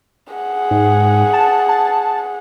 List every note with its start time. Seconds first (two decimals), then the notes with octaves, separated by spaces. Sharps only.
0.33 G#4 F#5
0.71 G#2
1.33 A5
1.69 A5